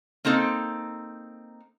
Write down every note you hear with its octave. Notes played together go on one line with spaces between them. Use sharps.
A#3 C4 D#4 A4